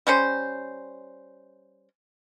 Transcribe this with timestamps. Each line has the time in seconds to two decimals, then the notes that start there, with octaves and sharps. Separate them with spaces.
0.07 G3 C#4 C5